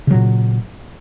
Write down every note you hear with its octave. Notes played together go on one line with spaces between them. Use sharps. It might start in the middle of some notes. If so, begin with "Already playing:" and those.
A#2 C#3 F#3